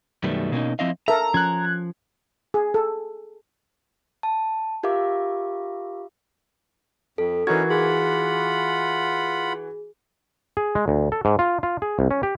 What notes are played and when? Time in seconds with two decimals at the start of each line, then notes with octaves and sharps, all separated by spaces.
0.23 F#2 B2 D#3 G3 A3 B3
0.52 B2 A#3 C4 C#4 D#4
0.79 F3 C4 E4 D#5 F5
1.08 A4 A#4 E5 A#5
1.34 F3 C#4 F#6 G#6
2.54 G#4
2.74 A4
4.23 A5
4.83 F4 G4 A#4 E5 F5 D6
7.18 F2 A4
7.47 E3 C#4 D#4 F#4 A#4 G#6
7.70 F4 G#4 F#5 B5
10.57 G#4
10.75 G#3
10.88 D2
11.12 A4
11.25 G#2
11.39 F4
11.63 F4
11.82 G#4
11.99 C2
12.11 C#4
12.23 G4